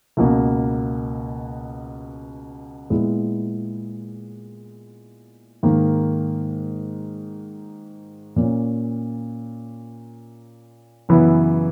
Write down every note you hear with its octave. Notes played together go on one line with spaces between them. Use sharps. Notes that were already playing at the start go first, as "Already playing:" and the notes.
C#2 B2 A#3
A#2 G#3 B3 E4
G#2 D#3 A#3
A#2 A#3 C#4
F#2 C#3 E3 B3 E4